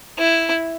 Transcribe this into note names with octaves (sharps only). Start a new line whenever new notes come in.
E4